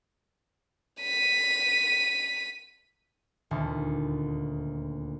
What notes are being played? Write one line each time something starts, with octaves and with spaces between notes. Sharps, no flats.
B6 D#7
D#1 D2